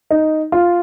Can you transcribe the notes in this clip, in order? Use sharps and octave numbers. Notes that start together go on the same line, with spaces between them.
D#4
F4